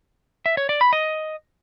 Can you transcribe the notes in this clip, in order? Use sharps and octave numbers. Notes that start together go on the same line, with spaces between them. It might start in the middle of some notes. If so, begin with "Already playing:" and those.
E5
C#5
D5
B5
D#5